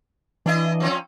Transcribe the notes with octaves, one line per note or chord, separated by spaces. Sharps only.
E3 D4 E4 D#5
F3 C4 C#4